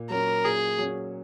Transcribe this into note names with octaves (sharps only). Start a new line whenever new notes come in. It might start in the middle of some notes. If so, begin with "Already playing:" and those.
Already playing: A#2
F#3 C#4 A#4
A#2 G#4
F#3 C#4